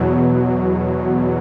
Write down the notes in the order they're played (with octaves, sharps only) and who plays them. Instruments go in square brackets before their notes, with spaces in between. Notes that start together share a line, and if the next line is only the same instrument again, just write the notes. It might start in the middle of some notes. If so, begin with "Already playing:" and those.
Already playing: [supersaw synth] E2 B2 F#3